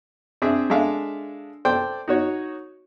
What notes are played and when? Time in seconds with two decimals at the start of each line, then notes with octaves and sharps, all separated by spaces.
0.42 C4 D4 G#4 E5
0.70 G#3 D4 A4 E5 F5
1.65 A4 C5 D5 G5
2.08 D#4 F#4 C#5